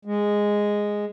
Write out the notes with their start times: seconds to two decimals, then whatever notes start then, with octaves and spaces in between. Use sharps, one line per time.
0.05 G#3